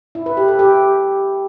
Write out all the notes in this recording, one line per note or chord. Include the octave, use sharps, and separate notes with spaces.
E4
B4
G4
A4
G4